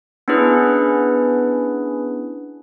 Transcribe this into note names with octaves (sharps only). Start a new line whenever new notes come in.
B3 C#4 D4 E4 G#4 B4